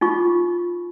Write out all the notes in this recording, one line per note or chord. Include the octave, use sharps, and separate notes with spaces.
D#4 F4 C#6